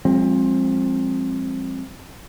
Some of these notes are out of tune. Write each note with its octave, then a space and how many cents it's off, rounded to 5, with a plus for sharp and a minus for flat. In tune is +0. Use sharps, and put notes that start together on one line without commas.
F3 +15 G#3 -30 C4 +20